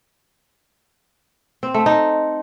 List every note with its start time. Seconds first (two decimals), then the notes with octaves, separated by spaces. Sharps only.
1.63 C4
1.74 A3
1.86 D#4